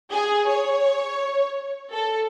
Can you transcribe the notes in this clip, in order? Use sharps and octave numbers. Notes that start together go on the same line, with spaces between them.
G#4
C#5
A4